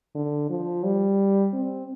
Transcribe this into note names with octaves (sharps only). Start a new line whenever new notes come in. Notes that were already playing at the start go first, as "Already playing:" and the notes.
D3
F3
G3
C4